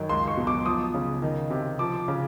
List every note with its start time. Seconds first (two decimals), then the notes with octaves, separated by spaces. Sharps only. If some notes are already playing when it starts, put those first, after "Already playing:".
Already playing: F#2 D#3
0.09 C#2 C6
0.27 C#6
0.37 B2
0.47 D6
0.65 F3 D#6
0.94 C#3
1.22 D#3
1.50 C3
1.79 F3 D6
2.08 C#3